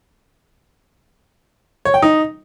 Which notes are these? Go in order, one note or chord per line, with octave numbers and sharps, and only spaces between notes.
C#5
G5
D#4